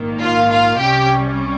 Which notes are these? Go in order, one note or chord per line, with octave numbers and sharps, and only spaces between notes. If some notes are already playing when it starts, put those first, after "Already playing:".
Already playing: A#1 G#2 D#3 A#3
F4 F5
F4 F5
C2 C3 G3 C#4 G4 G5